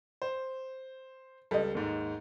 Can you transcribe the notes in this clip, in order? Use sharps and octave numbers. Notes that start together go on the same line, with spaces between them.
C5
C#2 G3 A4 D#5
D#2 G#2